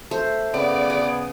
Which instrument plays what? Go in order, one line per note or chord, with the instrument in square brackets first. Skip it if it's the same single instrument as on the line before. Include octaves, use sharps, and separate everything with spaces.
[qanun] A3 C5
[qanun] C#3 [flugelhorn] B3 [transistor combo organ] D5
[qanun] G#4